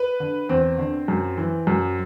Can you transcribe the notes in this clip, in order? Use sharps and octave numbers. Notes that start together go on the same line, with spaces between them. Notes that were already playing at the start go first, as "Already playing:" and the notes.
Already playing: B4
D3
E2 C4
D3
F#2
E3
F#2